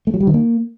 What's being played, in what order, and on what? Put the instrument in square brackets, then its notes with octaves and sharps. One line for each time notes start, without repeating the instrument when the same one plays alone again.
[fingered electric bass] A3
F#3
G3
D#3
A#3